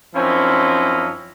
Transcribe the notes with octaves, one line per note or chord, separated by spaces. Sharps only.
F#2 F3 C4 C#4 D#4 E4